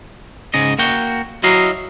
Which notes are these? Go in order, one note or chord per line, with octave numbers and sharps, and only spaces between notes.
G#2 C#3 D#5
A#3 F#4 G5
F#3 E4 D#5 F5